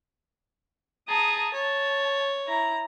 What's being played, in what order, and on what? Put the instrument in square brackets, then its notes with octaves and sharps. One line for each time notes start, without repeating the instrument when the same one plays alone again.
[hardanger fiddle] G#4 [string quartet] A5 A#5 D#6
[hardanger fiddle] C#5 [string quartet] A5
[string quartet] E4 A#5